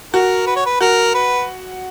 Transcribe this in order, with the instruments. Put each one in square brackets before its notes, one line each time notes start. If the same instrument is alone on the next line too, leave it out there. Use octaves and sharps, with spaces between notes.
[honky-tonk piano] F#4 [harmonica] A#4
[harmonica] B4
C#5
B4
[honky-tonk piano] F#4 [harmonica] A#4
[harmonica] B4